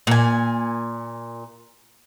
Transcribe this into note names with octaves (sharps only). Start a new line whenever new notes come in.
A#2 G#5